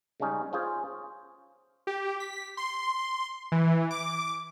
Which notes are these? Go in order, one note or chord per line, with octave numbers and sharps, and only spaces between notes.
C#3 G3 G#3 C#4 D#4
C#4 F4 G#4 C5
G4
B6
C6
E3
D6